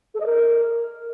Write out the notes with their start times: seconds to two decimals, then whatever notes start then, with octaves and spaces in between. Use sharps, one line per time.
0.14 A4
0.20 D#5
0.25 A#4